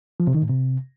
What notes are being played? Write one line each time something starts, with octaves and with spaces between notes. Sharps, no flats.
F3
C3
D#3
A2
C3